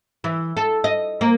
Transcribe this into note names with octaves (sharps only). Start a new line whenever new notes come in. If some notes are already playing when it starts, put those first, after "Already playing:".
E3
A4
D#5
A#3